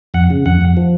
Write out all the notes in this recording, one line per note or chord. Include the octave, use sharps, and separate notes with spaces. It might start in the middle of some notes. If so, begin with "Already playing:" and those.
F2 F#5
C#3
F2 F#5
F2
F3